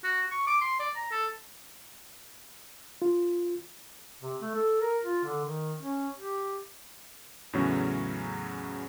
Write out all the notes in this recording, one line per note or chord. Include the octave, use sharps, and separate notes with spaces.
F#4
C#6
D6
C6
D5
A#5
A4
F4
C3
A3
A4
A#4
F4
D3
D#3
C#4
G4
E2 A2 C#3 F#3 C#4